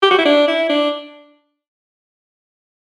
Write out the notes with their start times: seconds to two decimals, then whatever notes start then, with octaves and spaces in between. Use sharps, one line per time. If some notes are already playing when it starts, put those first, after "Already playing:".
0.03 G4
0.11 F#4
0.19 E4
0.25 D4
0.48 E4
0.69 D4